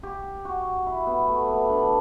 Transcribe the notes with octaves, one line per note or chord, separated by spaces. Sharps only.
G4
F#4
E4
B3
A3
B3
D4